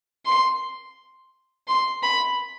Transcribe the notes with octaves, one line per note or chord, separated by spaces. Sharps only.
C6
C6
B5